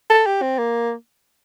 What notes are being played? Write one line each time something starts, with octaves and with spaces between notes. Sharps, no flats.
A4
G4
C4
A#3